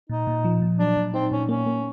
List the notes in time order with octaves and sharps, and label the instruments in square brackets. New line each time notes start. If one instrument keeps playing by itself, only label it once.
[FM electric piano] A#2 [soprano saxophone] D#4
[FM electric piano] A#2
F3
A#2
[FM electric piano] F#3 [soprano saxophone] D4
[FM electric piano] A#2
[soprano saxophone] C4 [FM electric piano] D#4
[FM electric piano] A#2 [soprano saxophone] C#4
[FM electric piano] A#3 [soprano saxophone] C#4
[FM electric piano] A#3